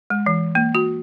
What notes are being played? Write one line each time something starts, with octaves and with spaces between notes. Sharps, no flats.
G#3
E3
A#3
F#4